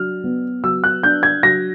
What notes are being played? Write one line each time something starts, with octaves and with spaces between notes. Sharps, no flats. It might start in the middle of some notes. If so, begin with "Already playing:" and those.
Already playing: F#3 D4 F6
B3
F#3 E6
F#6
D4 G6
G#6
F#3 A#6